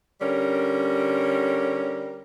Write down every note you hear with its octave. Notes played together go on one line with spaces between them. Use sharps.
D3 G3 C#4 A#4